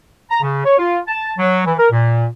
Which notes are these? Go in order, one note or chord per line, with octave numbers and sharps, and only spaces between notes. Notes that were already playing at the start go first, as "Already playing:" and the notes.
A#5
C#3
C#5
F4
A5
F#3
E3
A#4
A#2